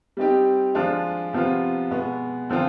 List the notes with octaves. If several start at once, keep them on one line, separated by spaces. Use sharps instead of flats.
G3 C4 D#4 G4
F3 G#3 D4 F4
C3 F3 B3 F4
B2 G#3 B3
D3 F3 C4 F4